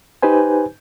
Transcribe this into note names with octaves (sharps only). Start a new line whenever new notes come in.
D#4 G4 B4 C5 G#5